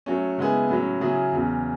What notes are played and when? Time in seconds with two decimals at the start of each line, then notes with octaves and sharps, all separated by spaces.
0.06 F#3 A3 C#4
0.38 C#3 G#3 B3 E4 G#4
0.69 A2 F#3 C#4
1.01 C#3 F#3 C#4 E4 G#4
1.32 E2 C#3 F#3